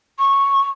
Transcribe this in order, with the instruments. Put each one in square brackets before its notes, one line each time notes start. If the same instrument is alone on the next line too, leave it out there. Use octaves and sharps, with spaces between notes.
[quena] C#6